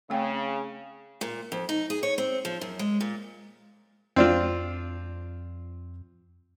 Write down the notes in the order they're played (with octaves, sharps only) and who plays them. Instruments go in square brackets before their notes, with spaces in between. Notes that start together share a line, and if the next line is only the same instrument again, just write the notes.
[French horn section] C#3 [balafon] A3 C4 G5
[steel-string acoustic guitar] A#2
F2
D#4
G#4
C#5
C4
F3
F#2
G#3
A#2
[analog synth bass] F2 [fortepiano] C4 D4 F4